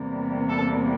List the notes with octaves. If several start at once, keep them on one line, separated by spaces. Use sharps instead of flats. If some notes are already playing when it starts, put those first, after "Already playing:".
Already playing: E2 C3 E3 G3 A#3
A4